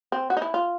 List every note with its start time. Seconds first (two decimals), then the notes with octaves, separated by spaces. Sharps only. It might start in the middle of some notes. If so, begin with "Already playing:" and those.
0.12 C4
0.30 F#4
0.37 D#4
0.42 E4
0.54 F4